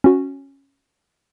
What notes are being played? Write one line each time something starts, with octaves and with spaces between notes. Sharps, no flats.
C#4 F#4